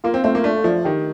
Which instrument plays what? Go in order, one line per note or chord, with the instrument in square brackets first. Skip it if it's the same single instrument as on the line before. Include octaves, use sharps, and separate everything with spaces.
[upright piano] A#3 [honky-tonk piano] F4
[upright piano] C4
[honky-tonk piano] A3 [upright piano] C4
[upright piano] A#3
[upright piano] A3 [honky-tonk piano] D4
[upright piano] F3 [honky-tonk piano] A3
[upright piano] D#3 [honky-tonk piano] G4